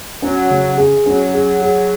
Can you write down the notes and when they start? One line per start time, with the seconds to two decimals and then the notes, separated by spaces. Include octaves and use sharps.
0.21 F#3 C#4
0.50 C#3
0.77 G#4
1.06 F#3 C#4
1.33 G#4
1.62 G#4